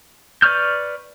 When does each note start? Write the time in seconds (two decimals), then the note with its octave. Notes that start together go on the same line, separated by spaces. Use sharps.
0.42 B4 D5 C#6 F6 G6